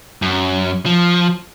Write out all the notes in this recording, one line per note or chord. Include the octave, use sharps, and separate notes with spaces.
F#2
F3